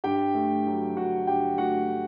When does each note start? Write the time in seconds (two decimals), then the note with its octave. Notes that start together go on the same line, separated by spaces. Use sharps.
0.04 G2 G4 G5
0.34 A3
0.66 F#3
0.97 G2 F#4 F#5
1.27 G2 G4 G5
1.58 A3 F#4 F#5